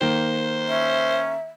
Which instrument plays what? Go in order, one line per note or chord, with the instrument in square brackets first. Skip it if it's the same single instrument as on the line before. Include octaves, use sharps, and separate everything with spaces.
[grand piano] D#3 A#3 [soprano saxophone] C5
[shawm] C#4 [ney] E5